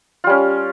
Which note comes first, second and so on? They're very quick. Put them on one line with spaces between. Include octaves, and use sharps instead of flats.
F4 G3 C#4